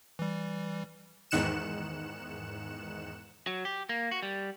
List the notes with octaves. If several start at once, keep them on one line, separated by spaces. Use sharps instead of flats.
E3 G3
E2 G#2 D#3 F#6 C#7 E7
F#3
G4
A#3
F#4
G3